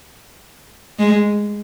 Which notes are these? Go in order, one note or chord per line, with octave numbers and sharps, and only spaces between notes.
G#3